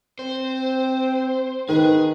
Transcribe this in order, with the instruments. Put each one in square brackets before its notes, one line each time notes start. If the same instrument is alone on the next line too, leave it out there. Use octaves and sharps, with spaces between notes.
[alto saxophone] C4 [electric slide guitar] C5
[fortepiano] D#3 [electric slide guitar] G#4 [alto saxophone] B4